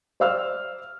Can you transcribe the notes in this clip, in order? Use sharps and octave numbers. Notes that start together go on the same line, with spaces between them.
C5 D5 F5 E6 F6